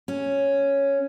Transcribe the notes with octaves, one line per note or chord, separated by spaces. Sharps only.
C#4